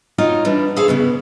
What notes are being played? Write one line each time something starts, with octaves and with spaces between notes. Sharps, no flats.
D#4 F4 F#4 C#5
E3 G3 D4
G#4 A4 C5 C#5 F5
C#3 G3 B3